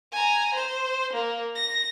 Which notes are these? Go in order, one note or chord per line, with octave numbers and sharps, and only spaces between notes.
G#5 A#5
C5
A#3
A#6